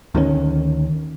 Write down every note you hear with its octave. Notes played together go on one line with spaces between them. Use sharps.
D2 D#3 E3 C#4